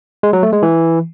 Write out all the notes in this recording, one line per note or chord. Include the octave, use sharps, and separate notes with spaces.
G#3
F#3
A3
G#3
E3